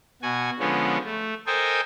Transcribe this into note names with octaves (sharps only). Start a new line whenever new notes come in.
B2 F#4 G#5
D3 F3 G#3 B3 C#4
A3
A4 A#4 C5 D#5 G5 G#5